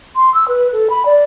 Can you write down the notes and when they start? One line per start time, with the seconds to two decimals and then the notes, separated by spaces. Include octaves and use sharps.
0.15 C6
0.34 E6
0.48 B4
0.72 A4
0.89 B5
1.05 D5